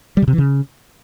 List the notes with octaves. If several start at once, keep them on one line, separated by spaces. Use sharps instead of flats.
G3
C#3
C3
E3
C#3